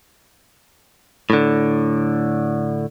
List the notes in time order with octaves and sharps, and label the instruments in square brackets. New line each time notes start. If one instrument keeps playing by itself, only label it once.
[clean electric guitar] A2 D3